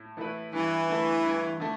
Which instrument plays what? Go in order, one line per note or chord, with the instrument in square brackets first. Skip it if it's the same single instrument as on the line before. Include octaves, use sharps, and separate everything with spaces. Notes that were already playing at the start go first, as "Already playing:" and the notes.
Already playing: [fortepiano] A2
E3 A3 E4 B4
[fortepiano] G2 [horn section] E3
[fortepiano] D3 A3
G2
D3 A3